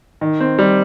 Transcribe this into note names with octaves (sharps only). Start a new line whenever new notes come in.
D#3
C4
G3